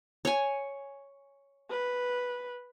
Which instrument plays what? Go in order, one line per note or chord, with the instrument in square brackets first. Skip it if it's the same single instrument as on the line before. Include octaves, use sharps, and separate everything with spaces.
[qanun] C#5 G#5
[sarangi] B4